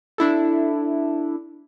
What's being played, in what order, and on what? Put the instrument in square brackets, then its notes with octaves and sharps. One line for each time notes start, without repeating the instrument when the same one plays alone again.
[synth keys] D4 E4 A4